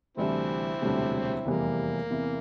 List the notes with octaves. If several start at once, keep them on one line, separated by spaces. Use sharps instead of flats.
D2 C3 E3 G3 C4 D4 E4
E1 D2 C3 G3 D4
F1 E2 E3 G3 A#3
E2 C3 E3